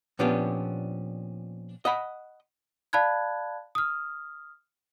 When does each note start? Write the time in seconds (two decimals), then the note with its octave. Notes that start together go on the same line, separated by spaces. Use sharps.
0.19 A#2 F3 B3 C#4 D4 G4
1.85 D#5 F#5 B5
2.93 D5 F5 A5 B5 F#6 G#6
3.75 D#6 F6